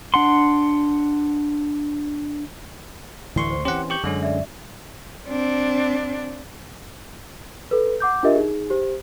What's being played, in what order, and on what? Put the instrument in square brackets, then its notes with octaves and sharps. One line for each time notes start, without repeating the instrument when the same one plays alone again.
[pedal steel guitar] D4 F#5 C6
[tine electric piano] D2 C6 C#6 [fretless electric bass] A2 E3
[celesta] C5
[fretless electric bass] E3 C4 C#4 [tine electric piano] G4 F#5 [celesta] C6
[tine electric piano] G4 C#6 G6 [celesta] F#7
[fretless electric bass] F#2 [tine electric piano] D3 G#3 C#4
[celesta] D5 E5
[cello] C4 D4
[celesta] A4 B4
F#5 D6 G6
D4 F4 G4 A#4 D#5 E5
D#4 G#4
G4 C5